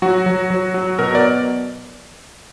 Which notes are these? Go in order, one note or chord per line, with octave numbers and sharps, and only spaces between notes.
F#3 F#4
F#3
F#3
F#3
B2 A#4
D5